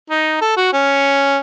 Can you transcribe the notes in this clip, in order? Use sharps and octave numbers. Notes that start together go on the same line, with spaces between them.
D#4
A4
F#4
C#4